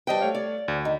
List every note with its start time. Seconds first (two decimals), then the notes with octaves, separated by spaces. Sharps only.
0.07 G3 B4 C5 D#5 G5 A5
0.21 A3 C#5 F5
0.35 D5
0.68 D2
0.85 D#3